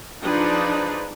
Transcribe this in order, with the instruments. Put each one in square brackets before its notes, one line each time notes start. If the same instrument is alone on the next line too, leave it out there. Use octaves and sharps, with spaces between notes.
[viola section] F3 D4 D#4 [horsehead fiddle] G#4 B4